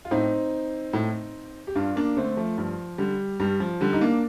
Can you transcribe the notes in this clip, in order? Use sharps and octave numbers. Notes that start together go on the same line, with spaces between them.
F4
A2 C4 D#4
A2
G4
G2 D4 F4
A#3 D4
D3 A3 C4
F3 A3
G2 F3
D3 G3
G2 G3
F3
D3 G3
D#4
A#3 D4